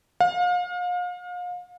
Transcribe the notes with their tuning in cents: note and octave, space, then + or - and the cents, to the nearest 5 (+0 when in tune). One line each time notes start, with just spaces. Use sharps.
F5 +35